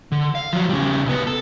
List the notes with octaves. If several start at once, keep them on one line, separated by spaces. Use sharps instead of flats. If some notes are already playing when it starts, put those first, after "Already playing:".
D3
F5
F3 F#3
C#3 G3
C2 B3
A4